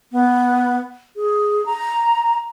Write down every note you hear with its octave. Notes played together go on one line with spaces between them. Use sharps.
B3
G#4
A#5